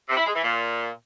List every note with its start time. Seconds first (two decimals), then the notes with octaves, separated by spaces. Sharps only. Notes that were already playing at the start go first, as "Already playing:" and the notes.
0.08 C3
0.17 E4
0.26 G#3
0.35 E3
0.44 A#2